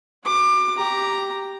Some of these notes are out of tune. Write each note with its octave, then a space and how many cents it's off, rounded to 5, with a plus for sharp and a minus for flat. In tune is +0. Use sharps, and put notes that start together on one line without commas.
F#4 +5 D6 +25
G4 +0 A#5 +0